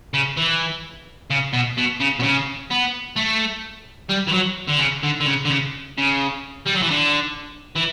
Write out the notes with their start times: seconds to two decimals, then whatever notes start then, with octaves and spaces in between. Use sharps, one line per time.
0.14 C#3
0.37 E3
1.30 C#3
1.53 B2
1.77 B2
2.00 C#3
2.19 B2
2.23 C#3
2.70 B3
3.16 A3
4.10 G3
4.28 E3
4.34 F#3
4.69 D3
4.80 C#3
5.04 D3
5.20 D3
5.26 C#3
5.45 D3
5.50 C#3
5.98 C#3
6.66 G3
6.75 F#3
6.82 E3
6.90 D3
7.75 E3